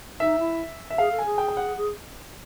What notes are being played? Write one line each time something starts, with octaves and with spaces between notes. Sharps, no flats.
D#4 E5
E4
E5
G#4 F5
A4
G#5
G#4
G5
G5
F#5
G#4